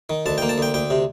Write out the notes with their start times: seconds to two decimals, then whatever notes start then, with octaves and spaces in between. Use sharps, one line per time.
0.10 D#3
0.26 D2 A5
0.38 A#3 G5
0.49 A5
0.58 D2 G5
0.74 D2 G5
0.90 C3